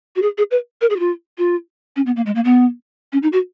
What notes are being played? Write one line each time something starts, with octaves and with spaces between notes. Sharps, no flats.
F#4
G#4
G#4
B4
A#4
G#4
F#4
F4
F4
C#4
B3
A#3
G#3
A#3
B3
C#4
D#4
F#4